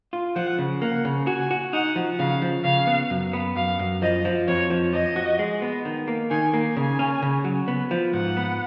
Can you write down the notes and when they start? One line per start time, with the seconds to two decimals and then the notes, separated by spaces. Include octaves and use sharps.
0.13 F4
0.36 F3 F#5
0.58 C#3
0.81 A#3 F#5
1.05 C#3
1.27 F#4 G#5
1.51 F#4
1.73 D#4 F#5
1.96 F3
2.19 C#3 F5
2.42 F3
2.64 C#3 F5
2.87 B3
3.10 F#2
3.33 B3
3.56 F#2 F5
3.79 F#2
4.02 F3 D#5
4.25 F3
4.48 F2 C#5
4.70 F3
4.93 F3 D#5
5.16 F#4
5.39 G#3
5.62 B3
5.85 D#3
6.08 A#3
6.31 D#3 G#5
6.54 A#3
6.77 C#3 G#5
6.99 C#4
7.22 C#3
7.44 F#3
7.68 B3
7.91 F3
8.13 G#2 F#5
8.37 B3